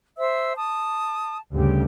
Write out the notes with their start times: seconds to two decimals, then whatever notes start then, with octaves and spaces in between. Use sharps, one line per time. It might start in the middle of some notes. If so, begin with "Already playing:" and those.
0.18 C5 E5 E6
0.56 A5 D#6
1.53 D2 G2 C#3 G4